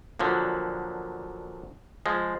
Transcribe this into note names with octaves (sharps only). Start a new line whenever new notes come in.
A#2 D3 F3 F#3
F3 G#3